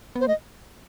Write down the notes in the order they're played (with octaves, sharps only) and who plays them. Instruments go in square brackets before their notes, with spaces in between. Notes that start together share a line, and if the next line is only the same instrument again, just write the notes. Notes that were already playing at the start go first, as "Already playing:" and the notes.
[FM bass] B3 [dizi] C5
[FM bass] A3 [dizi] D#5